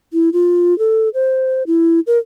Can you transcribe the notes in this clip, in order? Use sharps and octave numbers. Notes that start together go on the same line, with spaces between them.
E4
F4
A4
C5
E4
A#4